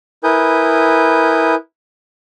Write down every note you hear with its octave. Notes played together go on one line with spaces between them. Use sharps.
E4 A#4 B4 G#5 D#6 G6